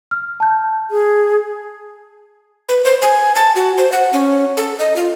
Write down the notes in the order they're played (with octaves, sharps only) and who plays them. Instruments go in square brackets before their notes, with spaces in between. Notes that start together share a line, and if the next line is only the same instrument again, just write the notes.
[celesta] F6
A5 G6
[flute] G#4
[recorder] B4
C5
G#5
A5
F#4
C5
F#5
C#4
A4
D#5
F4